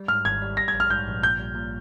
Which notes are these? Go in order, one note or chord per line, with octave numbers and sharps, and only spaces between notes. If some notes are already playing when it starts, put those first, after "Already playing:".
Already playing: G3
G#2 F6
G#1 G#6
G3
G3 A#6
G#6
A#1
F6
G#2 G6
A#1
A#2 G6
G3
A#2